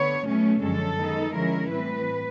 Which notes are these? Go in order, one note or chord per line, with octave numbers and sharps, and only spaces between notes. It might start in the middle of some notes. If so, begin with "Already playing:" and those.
Already playing: D3 B3 C#5
B2 F#3 A3 C#4
F#2 D3 F3 G#3 C#4 A4
D#3 G#3 B3 D#4
D3 F3 G#3 C#4 E4 A#4
A2 E3 G3 C4 B4